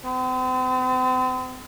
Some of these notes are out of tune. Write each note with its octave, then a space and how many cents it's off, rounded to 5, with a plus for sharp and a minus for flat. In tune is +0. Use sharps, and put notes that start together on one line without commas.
C4 -40